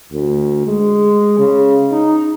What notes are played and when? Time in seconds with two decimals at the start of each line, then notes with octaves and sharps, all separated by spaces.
0.13 D2
0.67 G#3
1.39 C#3
1.92 D#4